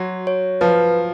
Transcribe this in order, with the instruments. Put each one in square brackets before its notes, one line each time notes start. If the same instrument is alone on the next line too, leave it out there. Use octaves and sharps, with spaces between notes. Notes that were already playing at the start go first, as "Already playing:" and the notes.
Already playing: [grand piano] F#3 [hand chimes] F#4
[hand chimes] C#5
[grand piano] F3 [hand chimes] B4